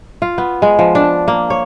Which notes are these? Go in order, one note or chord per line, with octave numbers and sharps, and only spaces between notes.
F4
B3
G#3
F3
D4
A#3
C#5